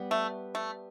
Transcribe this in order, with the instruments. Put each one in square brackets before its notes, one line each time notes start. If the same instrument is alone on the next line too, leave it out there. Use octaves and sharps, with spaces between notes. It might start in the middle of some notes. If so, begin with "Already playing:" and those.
Already playing: [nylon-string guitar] G3 B3 G4 B4 D5
[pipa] A3
A3